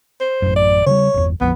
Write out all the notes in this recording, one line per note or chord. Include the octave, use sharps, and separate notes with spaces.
C5
A1 F#2
D5
C#3 F3 G3 C#5
G1 E2
A#1 F2 F3 B3